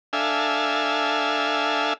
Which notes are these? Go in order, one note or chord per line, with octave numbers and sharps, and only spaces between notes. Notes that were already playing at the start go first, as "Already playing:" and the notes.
D4 A4 E5 F5 G#5